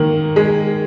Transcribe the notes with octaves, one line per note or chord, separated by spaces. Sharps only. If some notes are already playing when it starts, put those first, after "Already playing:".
Already playing: D#3 A#3
G#3